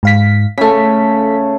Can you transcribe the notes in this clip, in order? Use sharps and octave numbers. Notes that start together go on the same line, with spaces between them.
G#2 F5 B6
C#3 A3 A4 B6